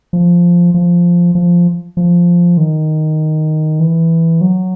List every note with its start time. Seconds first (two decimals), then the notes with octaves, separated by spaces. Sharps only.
0.13 F3
0.74 F3
1.35 F3
1.97 F3
2.57 D#3
3.80 E3
4.41 F#3